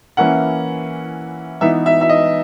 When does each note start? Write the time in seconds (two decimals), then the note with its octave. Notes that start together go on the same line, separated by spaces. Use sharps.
0.17 E3 A#3 C#4 E4 F#5
1.61 E3 B3 D#4 E5
1.86 E5
2.01 E5
2.09 D#5